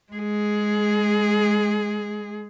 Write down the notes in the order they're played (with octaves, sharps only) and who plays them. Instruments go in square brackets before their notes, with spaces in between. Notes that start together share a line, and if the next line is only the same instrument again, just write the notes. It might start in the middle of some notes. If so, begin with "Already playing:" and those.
[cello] G#3 G#4